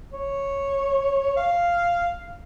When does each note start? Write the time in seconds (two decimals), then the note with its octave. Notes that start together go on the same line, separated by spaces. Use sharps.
0.13 C#5
1.36 F5